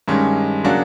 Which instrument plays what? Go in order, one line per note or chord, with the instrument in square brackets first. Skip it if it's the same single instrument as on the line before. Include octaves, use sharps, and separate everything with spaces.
[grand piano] G2 D#3 G#3 C#4
C#3 F#3 A#3 D4 F#4